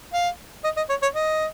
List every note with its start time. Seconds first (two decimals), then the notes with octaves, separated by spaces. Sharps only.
0.13 F5
0.64 D#5
0.77 D#5
0.89 C#5
1.02 C#5
1.15 D#5